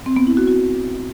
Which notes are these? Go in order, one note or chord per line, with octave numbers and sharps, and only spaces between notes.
C4
B3
E4
F#4
F#4